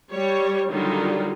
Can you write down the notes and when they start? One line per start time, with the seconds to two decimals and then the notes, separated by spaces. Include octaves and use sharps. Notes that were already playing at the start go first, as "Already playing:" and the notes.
0.12 G3 C#5
0.70 D3 D#3 F#3 G3 D#4 F4